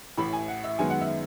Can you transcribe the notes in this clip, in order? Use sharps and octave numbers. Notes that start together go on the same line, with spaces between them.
A1 A2 E3 B5
G#5
F#5
E5
F#2 D#3 G#3 B3 G#5
F#5
E5